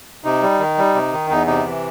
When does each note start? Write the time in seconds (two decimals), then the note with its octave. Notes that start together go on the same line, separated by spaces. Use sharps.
0.24 C3 D#4
0.43 G3
0.60 D#3
0.78 G3
0.95 C3
1.13 D#3
1.30 E2 D#4
1.47 C3 D#4
1.65 E3